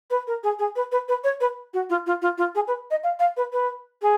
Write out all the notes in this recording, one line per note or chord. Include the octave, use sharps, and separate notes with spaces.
B4
A#4
G#4
G#4
B4
B4
B4
C#5
B4
F#4
F4
F4
F4
F4
G#4
B4
D#5
F5
F5
B4
B4
G#4